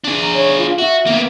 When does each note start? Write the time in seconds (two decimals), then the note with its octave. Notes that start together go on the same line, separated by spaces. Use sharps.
0.04 D4 G#4
0.22 A#5
0.34 C#5
0.59 F4
0.78 F#4 E5
1.07 A#3 B3